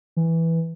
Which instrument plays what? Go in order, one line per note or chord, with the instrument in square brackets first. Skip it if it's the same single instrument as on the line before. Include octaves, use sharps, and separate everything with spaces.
[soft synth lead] E3